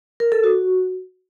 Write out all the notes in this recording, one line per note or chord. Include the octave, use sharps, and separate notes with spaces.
A#4
A4
F#4